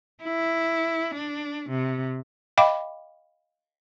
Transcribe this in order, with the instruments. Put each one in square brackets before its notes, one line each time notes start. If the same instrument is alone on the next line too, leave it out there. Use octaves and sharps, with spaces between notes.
[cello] E4
D4
C3
[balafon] D#5 F5 G5 B5 D6